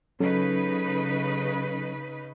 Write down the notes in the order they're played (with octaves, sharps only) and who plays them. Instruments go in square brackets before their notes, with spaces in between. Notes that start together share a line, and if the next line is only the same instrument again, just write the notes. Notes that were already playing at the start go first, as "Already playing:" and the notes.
[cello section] C#3 D#4 B4 [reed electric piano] F#3 C#4 A4